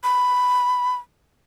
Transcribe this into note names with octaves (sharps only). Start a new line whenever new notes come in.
B5